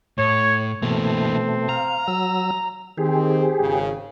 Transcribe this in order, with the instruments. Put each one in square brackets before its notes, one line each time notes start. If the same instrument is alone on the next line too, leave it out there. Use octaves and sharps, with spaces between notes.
[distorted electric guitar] A2 [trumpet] C#5
[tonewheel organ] B2 A3 [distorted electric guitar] E3 A#3 [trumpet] C4
[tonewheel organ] F5 [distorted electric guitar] A#5
[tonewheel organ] F#3 E6
[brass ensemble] D#3 C4 [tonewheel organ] G4 G#4
[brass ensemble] G#1 C#3